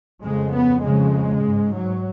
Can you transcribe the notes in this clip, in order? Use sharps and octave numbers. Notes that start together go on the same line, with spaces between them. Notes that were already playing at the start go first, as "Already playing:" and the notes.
F2 C#3 G#3
B3
F2 C#3 G#3
G#2
F#3